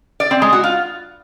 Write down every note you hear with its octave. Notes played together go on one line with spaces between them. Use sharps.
D5
C4
G#3
F#4
F4